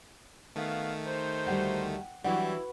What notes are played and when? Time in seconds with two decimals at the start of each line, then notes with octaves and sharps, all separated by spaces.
0.56 D#3 A3 B3 F#4 F5
1.06 D#4 G4 C5
1.47 D2 G3 F#5 G5
2.24 E3 F#3 G3 D4 E4 F#4 B4 F#5